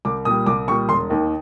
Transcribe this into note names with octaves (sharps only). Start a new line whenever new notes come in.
C2 D6
A#2 G3 D#6
C2 D6
A#2 G3 C#6
E1 C6
D#2 D#3